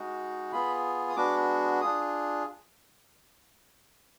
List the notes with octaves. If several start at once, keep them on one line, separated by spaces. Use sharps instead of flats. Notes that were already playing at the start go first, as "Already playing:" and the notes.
Already playing: G#3 D#4 F#4
B3 F4 G#4 B5
D#6
G#3 B3 D4 F#4 D6
D4 F4 G#4 D#6